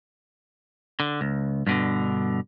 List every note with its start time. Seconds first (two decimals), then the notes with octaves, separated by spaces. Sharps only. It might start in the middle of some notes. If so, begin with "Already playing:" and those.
1.00 D3
1.21 C#2
1.67 G2 B2 D3